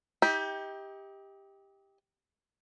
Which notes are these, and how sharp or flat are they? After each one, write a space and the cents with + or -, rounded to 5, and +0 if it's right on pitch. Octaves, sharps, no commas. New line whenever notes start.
D#4 +40 G4 +10